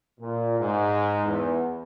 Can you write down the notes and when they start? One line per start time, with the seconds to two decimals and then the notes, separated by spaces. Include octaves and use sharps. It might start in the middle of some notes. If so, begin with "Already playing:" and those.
0.20 A#2
0.59 G#2
1.25 E2